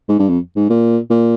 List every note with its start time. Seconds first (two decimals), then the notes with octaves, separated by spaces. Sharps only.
0.09 G#2
0.19 G2
0.29 F2
0.56 G#2
0.70 A#2
1.10 A#2